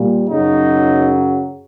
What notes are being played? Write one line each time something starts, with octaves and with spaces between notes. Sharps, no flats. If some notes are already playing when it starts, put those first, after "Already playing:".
Already playing: A#2 G3
F#2 C#3 F#3 D#4